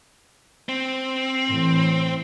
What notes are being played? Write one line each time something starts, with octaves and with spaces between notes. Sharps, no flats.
C4
A2 E3